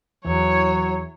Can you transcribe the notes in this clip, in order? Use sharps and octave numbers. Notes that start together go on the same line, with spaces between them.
E2 E3 F#3 C#5